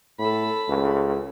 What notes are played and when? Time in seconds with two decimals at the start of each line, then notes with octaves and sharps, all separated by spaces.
0.19 A2 A4 B5
0.69 C#2